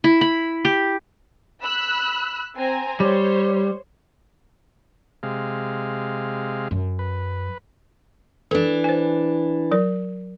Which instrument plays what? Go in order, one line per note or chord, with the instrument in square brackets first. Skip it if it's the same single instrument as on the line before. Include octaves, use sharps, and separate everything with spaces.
[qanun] E4
B5
G4
[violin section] B5 E6 F#6
C4 G#5 A#5
[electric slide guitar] G3 [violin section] C5 C#5
[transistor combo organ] C3 G#3 F5
[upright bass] F#2
[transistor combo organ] B4
[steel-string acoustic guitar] E3 D4 [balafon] A4
[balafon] C5 G#5
F#3 A#4 D5